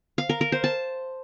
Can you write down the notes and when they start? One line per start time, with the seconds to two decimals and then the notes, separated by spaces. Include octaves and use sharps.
0.18 F5
0.29 A#4
0.41 A#4
0.52 C5
0.64 A5